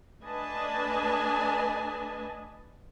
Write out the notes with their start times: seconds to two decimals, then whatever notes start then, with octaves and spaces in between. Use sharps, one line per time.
0.23 A3 D4 B4 D#5 G#5 A5